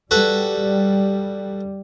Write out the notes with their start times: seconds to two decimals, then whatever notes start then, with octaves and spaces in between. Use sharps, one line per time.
0.11 G3 F#4 A4 B4